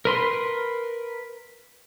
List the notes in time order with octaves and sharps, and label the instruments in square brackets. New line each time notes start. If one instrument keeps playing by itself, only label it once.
[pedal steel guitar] A#4 B4 C6